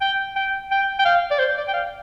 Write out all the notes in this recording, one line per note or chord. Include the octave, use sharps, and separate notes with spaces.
G5
G5
G5
G5
F5
D5
C5
D5
G5
F5